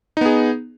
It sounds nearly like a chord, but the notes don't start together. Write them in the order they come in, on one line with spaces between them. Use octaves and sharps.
D#4 B3 G#4